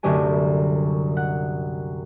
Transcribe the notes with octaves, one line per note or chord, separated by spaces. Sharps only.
C2 F#2 D3 A3 G4 G#5
F#5